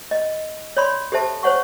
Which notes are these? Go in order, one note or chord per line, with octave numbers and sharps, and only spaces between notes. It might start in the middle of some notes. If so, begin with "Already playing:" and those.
D#5
C#5 D5 B5 C6
G4 A4 C5 E5 A5
C5 C#5 F#5 C#6